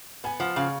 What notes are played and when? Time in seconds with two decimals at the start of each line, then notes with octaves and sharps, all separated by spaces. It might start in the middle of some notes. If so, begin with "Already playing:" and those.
0.24 B3 G#5
0.40 F3 F#5
0.56 C#3 F5